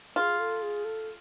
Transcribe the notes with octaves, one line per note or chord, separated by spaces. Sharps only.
F4 G#4
A4
G#4
A4